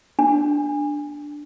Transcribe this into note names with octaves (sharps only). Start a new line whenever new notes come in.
D4